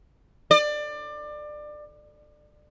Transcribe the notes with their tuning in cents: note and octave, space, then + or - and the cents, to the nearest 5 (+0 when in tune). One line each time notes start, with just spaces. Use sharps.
D5 +25